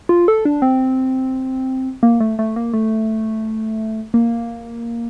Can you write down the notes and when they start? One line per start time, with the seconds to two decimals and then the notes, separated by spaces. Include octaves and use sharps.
0.09 F4
0.28 A4
0.45 D4
0.62 C4
2.03 A#3
2.20 A3
2.39 A3
2.56 A#3
2.73 A3
4.14 A#3